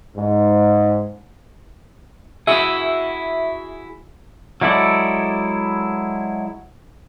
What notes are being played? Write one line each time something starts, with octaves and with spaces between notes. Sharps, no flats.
G#2
E4 F#4 G#4 E5
F#3 G#3 E4 A4 D5